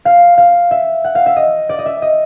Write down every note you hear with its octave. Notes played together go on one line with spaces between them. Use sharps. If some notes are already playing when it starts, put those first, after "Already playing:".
F5
F5
E5
F#5
F5
E5
D#5
D5
D#5
E5
D#5